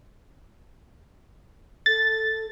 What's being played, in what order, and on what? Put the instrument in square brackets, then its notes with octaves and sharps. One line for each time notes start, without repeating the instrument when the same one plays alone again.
[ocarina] A4 [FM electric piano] A6